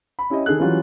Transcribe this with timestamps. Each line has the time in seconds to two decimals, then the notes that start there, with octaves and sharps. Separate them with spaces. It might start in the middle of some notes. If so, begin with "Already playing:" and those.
0.19 B5
0.30 C#4 E4 G4 D#5
0.46 D#3 G#4 A4 F#6
0.59 E3 F#3 G3 C#4 F4